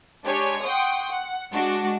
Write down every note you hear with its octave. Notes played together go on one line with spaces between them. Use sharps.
G#3 D4 G4 C#5 G#5
F#5 G5 C6 C#6 D#6
F#5
G#3 D4 F#4